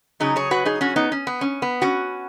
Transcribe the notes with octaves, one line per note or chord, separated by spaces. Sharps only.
C#3 F#3 D#4 G#4
G#4 C#5
F#4 B4
D#4 G#4
C#4 F#4
B3 D#4
C#4
B3
C#4
B3
C#4 F#4